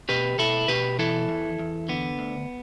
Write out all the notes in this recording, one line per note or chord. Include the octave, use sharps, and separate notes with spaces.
B2 G4 B4
B2 E4 A4
B2 G4 B4
E3 E4 A4
E2
E2
D3 B3
D2